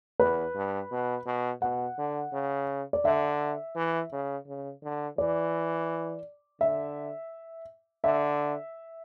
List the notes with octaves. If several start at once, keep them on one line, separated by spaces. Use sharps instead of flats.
E2 B4
G2
B2
B2
B2 F#5
D3
C#3
D5
D3 E5
E3
C#3
C#3
D3
E3 D5
D3 E5
D3 E5